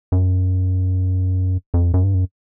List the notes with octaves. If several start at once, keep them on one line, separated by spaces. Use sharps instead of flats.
F#2
F2
F#2
G2
F#2